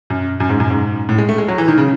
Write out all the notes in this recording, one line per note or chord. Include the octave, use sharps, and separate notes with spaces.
F#2
F#2
G#2
F#2
G#2
A2
G#3
A3
G#3
F#3
E3
D#3
C#3